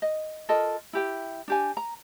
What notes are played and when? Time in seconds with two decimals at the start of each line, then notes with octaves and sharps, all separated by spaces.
0.02 D#5
0.49 F4 A4 A#4 D#5
0.93 E4 G4 G5
1.48 D4 G4 G#5
1.77 A#5